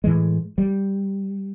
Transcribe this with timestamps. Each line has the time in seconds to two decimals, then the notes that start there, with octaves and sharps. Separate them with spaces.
0.04 A2 E3 G#3
0.58 G3